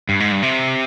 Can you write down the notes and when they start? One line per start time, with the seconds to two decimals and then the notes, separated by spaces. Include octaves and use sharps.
0.09 G2
0.20 G#2
0.32 G2
0.43 C3